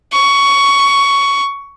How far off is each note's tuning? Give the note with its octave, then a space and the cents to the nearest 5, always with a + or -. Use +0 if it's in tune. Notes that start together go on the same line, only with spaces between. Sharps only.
C#6 +15